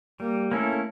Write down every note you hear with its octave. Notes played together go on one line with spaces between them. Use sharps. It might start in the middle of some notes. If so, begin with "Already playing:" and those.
G3 A#3
A3 A#3 C#4 E4 A4